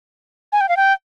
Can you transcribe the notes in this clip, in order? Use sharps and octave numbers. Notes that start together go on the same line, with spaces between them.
G#5
G5
F5
G5